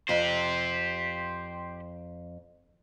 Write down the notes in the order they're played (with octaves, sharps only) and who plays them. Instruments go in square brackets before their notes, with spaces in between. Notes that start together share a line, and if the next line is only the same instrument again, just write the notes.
[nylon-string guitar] F2 [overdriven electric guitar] G4 C5